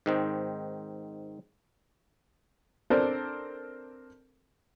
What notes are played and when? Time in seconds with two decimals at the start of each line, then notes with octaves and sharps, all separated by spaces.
0.06 G#2 D#3 C4
2.90 C4 D4 A4 A#4 C5 D5